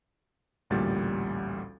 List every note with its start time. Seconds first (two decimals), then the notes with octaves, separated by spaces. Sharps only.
0.70 A1 D2 A#2 G3 A6